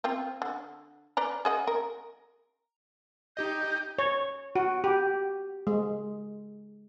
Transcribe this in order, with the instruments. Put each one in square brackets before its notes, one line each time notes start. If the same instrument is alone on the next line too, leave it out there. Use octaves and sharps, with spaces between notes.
[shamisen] C4 F4 C5
D3
B4 D5 A#5
G#4 D#5 F#5
A#4
[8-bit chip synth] D#4 G4 D#5 [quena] G6
[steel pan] C#5
F#4
G4
G#3